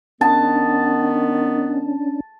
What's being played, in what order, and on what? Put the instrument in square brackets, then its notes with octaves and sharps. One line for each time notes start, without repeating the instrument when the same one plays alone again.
[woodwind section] D#3 B3 [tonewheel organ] C#4 D4 [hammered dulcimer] A5